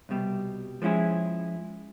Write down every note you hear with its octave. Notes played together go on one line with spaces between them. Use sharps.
C2 B2 G3
F3 G#3 C#4 E4 G#4